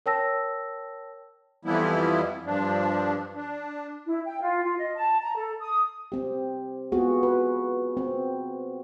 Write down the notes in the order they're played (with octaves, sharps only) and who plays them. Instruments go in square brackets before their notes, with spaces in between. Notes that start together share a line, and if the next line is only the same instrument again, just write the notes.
[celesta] A#4 C#5 G5 A5 E6 A#6
[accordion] F2 E3 F3 G3 B3 E4
G2 F3 D4
D4
[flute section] E4
G5
F4
F4
D#5
A5
A#5
A4
D#6
[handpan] C4 G4
B3 F4 F#4 G#4
B4
C4